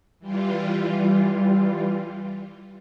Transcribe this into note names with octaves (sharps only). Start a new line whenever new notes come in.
E3 G3 F4